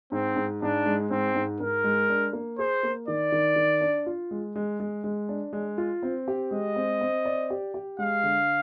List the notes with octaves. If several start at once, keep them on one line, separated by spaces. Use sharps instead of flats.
G#2 C4
G#2
G#2 D4
G#3
G#2 C4
G#2
G#2 A#4
G#3
D4
A#3
G#4 C5
A#3
D#3 D5
D#3
D#3
D4
F4
G#3
G#3
G#3
G#3
D4
G#3
F4
C4
G4
G#3 D#5
C4
C4
D5
G4
G4
G#3 F5
D3